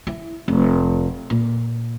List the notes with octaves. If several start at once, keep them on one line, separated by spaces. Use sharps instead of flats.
E4
F1
A#2